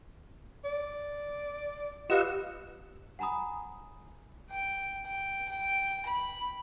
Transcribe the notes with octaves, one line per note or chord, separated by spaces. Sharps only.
D5
F4 G4 B4 D#5 F5 F#5 E6
F#5 G#5 A#5 B5 D#6
G5
G5
G5
B5